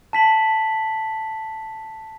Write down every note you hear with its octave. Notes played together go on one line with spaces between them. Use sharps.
A5 B6 F#7